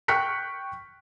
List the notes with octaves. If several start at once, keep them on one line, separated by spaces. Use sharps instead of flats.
G5 C#6 F6 F#6 B6 C#7